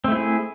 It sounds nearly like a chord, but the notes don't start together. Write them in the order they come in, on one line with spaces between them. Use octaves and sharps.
C4 A3 E4 G#4